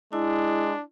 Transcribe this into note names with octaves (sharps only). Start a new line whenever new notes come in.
G#3 D4 E4